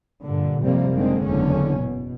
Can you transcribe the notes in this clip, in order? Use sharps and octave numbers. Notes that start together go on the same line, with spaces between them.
G2 A#2 D3
F2 C3 G3 A#3 C4
F#1 D3 D#3 G#3 C4
F#1 E2 D3 C#4
B2